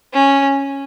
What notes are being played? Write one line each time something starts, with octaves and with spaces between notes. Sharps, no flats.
C#4